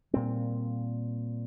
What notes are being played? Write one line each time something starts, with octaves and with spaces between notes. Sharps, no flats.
A#2 G3 C4